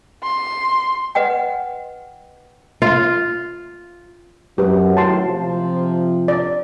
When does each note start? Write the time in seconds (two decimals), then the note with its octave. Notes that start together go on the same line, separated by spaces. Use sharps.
0.23 C6
1.15 B4 D#5 F#5 G5
2.82 F4
4.58 F#2 F#3 G4 B4
4.97 A2 D#3 F#3 A5 C6
5.27 C3 F3
6.28 D5